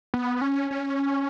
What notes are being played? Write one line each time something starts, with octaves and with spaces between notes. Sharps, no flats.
B3
C#4
C#4